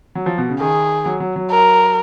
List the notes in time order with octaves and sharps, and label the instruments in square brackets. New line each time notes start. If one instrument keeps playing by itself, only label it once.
[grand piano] F#3
F3
B2
C#3
[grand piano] D#3 [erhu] G#4
[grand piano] F#3
F#3
F#3
[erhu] A#4